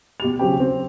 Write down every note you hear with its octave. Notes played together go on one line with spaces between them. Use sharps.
B2 G4 F7
C#3 F#3 C4 G4 G5
C4